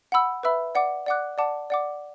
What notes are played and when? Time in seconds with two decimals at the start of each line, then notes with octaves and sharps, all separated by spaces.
0.12 F#5 B5 E6
0.43 B4 E5 B5 E6
0.75 D5 F#5 D6
1.06 D5 F#5 D6 F#6
1.38 D5 F#5 A5 D6
1.70 D5 F#5 D6